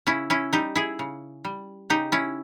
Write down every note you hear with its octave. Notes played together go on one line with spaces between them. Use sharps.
C#3 C#4 E4
C#4 E4
G3 D#4 G4
E4 G#4
C#3
G3
C#3 D#4 G4
C#4 E4